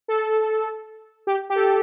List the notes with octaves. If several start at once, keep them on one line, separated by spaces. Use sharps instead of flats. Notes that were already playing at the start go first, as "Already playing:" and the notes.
A4
G4
G4
A4